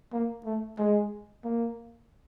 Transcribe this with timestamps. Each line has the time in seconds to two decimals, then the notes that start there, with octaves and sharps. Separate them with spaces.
0.13 A#3
0.45 A3
0.79 G#3
1.44 A#3